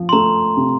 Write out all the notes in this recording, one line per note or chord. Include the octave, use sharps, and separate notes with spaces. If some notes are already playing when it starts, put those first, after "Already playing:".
Already playing: F3
C6
A3 A#5
C3